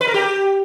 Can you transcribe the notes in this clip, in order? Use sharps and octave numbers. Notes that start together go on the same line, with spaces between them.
B4
A#4
G4